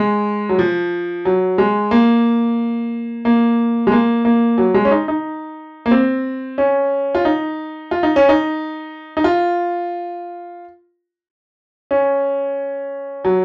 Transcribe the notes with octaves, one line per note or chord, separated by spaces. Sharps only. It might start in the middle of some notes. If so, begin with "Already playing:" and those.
Already playing: G#3
F#3
F3
F#3
G#3
A#3
A#3
G#3
A#3
A#3
F#3
G#3
C#4
D#4
D#4
A#3
C4
C#4
F4
D#4
F4
D#4
C#4
D#4
D#4
F4
C#4
F#3